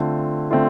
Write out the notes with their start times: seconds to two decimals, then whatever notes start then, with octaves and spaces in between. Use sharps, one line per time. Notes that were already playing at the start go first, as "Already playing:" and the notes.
Already playing: D3 A3 C4 F4
0.51 D3 A3 C4 F4